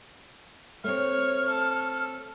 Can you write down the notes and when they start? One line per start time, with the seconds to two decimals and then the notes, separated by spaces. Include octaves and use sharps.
0.84 A3 C4 C#5 F6
1.49 A4